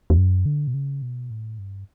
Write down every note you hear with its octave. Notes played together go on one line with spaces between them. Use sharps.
E2
F#2
D3
B2
C#3
B2
A2
G2